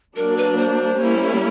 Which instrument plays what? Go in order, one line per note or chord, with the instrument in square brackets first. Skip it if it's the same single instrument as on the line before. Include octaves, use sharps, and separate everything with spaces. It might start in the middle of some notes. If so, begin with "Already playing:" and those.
[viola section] F#3 A#3 D4 [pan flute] A#4
[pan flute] B4
C5
[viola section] G3 A#3 C#4 E4